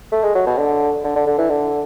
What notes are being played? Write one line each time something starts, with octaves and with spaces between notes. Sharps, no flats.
A3
G#3
F#3
B2
D3
D3
D3
D3
E3
D3